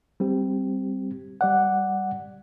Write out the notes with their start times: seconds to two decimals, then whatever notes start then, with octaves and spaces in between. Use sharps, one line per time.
0.20 G3 C4 G4
1.41 G3 D5 F#5